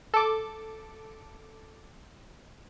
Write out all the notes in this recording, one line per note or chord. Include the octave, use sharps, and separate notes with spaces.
A4 D6